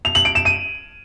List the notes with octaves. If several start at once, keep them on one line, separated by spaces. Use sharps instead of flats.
F7
F#7
D7
E7
D#7